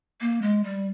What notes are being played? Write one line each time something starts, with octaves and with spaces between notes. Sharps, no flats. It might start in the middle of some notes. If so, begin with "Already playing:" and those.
A#3
G#3
G3